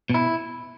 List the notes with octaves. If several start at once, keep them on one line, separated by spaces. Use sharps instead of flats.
B2 E4